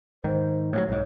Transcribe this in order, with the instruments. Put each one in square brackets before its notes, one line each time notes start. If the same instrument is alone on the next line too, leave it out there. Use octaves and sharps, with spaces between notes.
[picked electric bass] G#2 D#3 [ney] C5
[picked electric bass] A2 C#3 F#3 [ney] C#5
[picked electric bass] B1 G#2 [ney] C#5